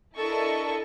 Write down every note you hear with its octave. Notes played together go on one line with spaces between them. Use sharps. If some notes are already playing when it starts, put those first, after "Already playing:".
D4 E4 A4 A#4 D#5 C#6